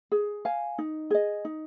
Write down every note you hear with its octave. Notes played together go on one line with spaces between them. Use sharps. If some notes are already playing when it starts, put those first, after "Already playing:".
G#4
F5 G#5
D#4
G#4 D#5
D#4